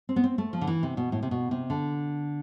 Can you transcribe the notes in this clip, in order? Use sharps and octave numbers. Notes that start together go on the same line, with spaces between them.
C4
B3
C4
A3
F3
D3
E3
C3
B2
A2
C3
B2
C3
D3